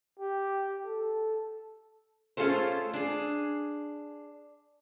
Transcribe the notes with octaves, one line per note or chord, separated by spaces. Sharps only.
G4
A4
A3 C#4 F4 G#4 A4 C5
D4 G#4